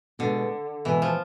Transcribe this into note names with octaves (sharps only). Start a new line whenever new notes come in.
B2 D3 G#3 B3
B2 E3 G#3 B3
F3